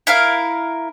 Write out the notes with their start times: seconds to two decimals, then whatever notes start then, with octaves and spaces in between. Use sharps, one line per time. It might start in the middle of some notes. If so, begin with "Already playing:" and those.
0.07 E4 A#4 F5